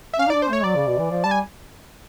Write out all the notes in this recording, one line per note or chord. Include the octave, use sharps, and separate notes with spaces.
E5
C#4 F5
D#4
D4 D5
C5
A3 C#5
F#3 D5
C#3
B2
E3
F3
G3 A5
G#5